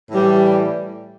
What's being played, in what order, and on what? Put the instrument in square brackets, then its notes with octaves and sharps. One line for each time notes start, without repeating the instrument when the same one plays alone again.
[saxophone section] A2 E3 G3